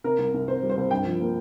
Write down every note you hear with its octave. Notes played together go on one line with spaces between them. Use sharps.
C3 A#4
C2
C2
C3 C5
G3
C5
C2
G2 G5
F3
A#3